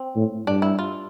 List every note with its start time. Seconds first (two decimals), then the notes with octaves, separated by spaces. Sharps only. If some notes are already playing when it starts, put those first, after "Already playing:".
Already playing: C4
0.16 A2
0.47 G2 D4
0.62 E4
0.79 F4